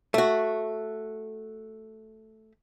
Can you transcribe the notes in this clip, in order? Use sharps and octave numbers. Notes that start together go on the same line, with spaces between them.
A3 F#4